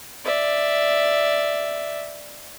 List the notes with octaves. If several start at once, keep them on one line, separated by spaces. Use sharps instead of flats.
D5 E5